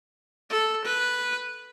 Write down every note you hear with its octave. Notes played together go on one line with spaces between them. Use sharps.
A4
B4